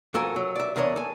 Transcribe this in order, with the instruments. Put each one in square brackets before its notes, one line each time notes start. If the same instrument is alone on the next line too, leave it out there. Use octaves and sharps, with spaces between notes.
[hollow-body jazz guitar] F2 F#4 A4 A#4 G#5
F#3
D5 E5
E2 D4 A#4 C#5 D#5
A4 G#5